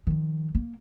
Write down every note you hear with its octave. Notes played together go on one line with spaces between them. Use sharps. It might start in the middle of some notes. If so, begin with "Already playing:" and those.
D#3 F3
A#3